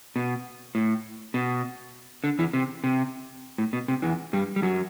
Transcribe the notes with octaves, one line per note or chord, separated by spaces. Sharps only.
B2
A2
B2
D3
E2 E3
C3
C3
A2
B2
C3
E2 E3
G2 G3
G3
F#2 F#3